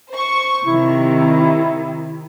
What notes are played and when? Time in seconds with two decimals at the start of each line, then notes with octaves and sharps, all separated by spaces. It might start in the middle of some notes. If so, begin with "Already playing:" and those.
0.11 C5 C#6
0.65 C3 D#3 E4